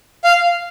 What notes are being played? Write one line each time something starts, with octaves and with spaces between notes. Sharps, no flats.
F5